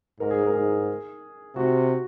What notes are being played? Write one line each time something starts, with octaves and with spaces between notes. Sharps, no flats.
G#2 A#4
G#4
A#4
G#2 G#4
C3 F#4